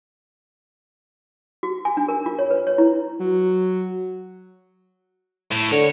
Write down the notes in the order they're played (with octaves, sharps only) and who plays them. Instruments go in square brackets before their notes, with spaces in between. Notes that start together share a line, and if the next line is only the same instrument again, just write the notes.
[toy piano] F#4
G#5
D4
A#4
F4
C#5
B4
C#5
E4
[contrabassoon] F#3
[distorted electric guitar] A2
[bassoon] D3 [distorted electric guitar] C#5